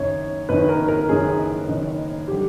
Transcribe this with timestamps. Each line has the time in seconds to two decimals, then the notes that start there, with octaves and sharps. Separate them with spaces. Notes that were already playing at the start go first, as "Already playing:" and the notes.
Already playing: F#1 F#2 D#3 C#5
0.49 F#1 F#2 D#3 B4
0.69 A#4
0.88 A#4
1.09 F#1 F#2 D#3 G#4
1.68 F#1 F#2 D#3
2.28 D3 G3 G4